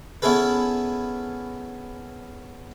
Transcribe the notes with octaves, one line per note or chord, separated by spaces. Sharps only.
B3 C#4 E4 G#4 A4 B4